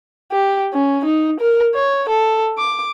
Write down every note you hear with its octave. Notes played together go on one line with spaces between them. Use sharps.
G4
C#4
D#4
A#4
C#5
A4
D6